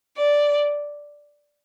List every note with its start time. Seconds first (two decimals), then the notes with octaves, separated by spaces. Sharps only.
0.17 D5